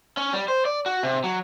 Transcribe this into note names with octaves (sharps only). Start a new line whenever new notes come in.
C#4
G3
C5
D5
F#4
C3
F#3